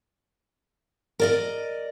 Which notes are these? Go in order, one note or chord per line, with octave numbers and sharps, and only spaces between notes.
A#4 D5 D#5